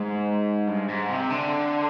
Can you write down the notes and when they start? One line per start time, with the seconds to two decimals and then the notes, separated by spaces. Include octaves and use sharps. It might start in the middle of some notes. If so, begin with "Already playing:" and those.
Already playing: G#2
0.67 G2
0.88 G#2
1.10 C3
1.30 D3